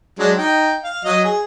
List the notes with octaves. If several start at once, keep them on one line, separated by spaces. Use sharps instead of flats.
F#3 G#3 D4
D#4 G5
F5
F#3 D#5 D#6
G#4